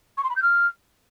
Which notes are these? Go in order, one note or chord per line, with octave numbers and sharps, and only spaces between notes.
C#6
C6
B5
G6
F6